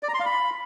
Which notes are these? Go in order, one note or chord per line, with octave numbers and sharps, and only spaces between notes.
D5
A#5
C6
F5
B5